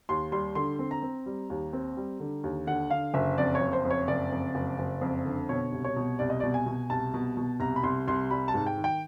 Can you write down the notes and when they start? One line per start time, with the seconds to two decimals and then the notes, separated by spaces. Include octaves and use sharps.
0.09 D#2 C6
0.32 G3 C6
0.55 D3 C6
0.79 C4
0.91 A#5
1.02 C4
1.26 G3
1.50 D#2
1.73 C4
1.97 G3
2.20 D3
2.43 D#2
2.67 D3 F#5
2.90 D3 F5
3.14 F#1 E5
3.38 F2 D5
3.55 C#5
3.61 F#1
3.73 C5
3.85 F2
3.91 C#5
4.08 F#1 D5
4.32 F2
4.55 F#1
4.79 F#1
5.01 F2
5.25 D3
5.49 B2 C#5
5.72 C2
5.85 C#5
5.96 B2
6.19 C2 D5
6.30 D#5
6.40 B2 D5
6.54 G#5
6.66 B2
6.90 C2 A5
7.14 B2
7.37 B2
7.60 C2 A#5
7.76 B5
7.84 C2 C6
8.08 C2 C6
8.31 G3 B5
8.48 A5
8.54 G#2
8.66 G5
8.77 D#3
8.84 G5